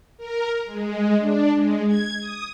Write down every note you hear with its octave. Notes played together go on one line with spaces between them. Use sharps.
A#4
G#3
D4
G#3
G#6
D#6